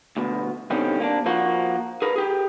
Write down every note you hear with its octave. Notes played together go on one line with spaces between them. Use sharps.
D2 B2
B2 D3 D#3 G3 C4 C#4
A#3 B3 D4
F3 A#3 F#4
G#4 A#4 B4
G4 G#4